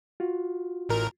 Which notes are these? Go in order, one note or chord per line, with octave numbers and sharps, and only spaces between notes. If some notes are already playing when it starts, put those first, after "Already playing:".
F4 F#4
A1 A#4